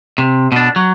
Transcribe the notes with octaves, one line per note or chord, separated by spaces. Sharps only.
C3
B2 D4
F#3